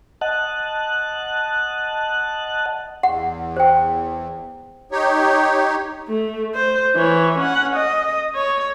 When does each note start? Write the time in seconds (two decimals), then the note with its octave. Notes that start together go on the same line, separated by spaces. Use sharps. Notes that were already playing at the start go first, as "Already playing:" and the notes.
0.21 D#5 F#5 A5 F#6
3.03 E2 F#5
3.57 C5 G5
4.92 D#4 G4 C#5
6.08 A3
6.55 C5
6.96 E3 C#5
7.39 C#4 F#5
7.76 D#5
8.35 C#5